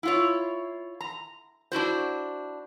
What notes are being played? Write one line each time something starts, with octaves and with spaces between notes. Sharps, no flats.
E4 F4 C#5
A#5
D4 E4 F#4 C5